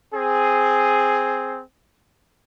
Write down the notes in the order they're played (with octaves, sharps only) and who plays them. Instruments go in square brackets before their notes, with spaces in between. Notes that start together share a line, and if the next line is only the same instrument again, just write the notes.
[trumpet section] C4 G#4